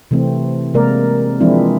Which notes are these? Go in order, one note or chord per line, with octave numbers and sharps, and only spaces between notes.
C3 E3 A3 C4
C3 G#3 A#3 A#4 D5
E3 F3 G#3 C4 D4 E4